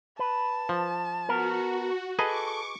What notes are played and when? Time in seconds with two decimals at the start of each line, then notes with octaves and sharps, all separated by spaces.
0.19 B4 A5
0.69 F3
1.29 B3 F#4 A#4
2.19 G#4 A4 B4 D#5 C#6 D6